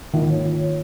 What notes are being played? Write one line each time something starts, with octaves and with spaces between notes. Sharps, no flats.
D#3 F4
C#5
F4
C#5